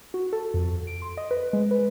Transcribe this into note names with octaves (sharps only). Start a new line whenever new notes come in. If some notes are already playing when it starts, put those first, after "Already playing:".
F#4
A4
F2
D7
C6
D#5
B4
G#3
B4